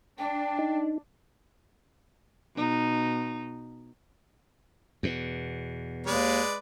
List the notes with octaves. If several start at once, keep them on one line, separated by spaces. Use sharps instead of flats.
D4 G5
D#4
B2 D#4
E2 B2
D#2 G#3 B4 D5